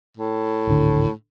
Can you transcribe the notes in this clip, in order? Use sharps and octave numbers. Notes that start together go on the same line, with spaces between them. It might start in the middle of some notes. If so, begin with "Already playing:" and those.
A2
D1 G#1 D3